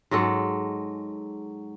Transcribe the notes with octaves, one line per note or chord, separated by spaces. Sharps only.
G#2 F#3 G#3 A4